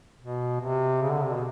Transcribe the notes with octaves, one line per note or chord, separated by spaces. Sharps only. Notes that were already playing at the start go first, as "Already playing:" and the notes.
B2
C3
C#3
D3
C3
B2